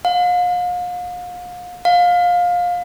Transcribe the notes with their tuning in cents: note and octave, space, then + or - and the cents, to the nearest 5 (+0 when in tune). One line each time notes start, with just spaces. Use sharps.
F5 +40
F5 +20